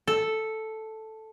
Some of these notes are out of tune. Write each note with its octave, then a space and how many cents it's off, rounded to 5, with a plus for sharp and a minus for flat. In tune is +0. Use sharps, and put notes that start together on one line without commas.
A4 +0